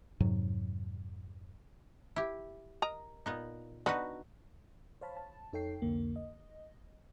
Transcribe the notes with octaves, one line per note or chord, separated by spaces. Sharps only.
F2 G#2 C3 F#3
E4 G4
A#4 D#5 A#5
A#2 B3 D#4
D3 B3 D#4 F#4 B4
C5 C#5 F5 A5 B5
A5
F2 D#4 A4 C#5 G5 C7
C2 F2 D3 A#3
D#5